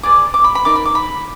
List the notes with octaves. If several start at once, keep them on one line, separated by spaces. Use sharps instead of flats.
G#4 B4 D5 D6
D6
B5
B5
D#4 A#4 D5 D6
B5
D6
B5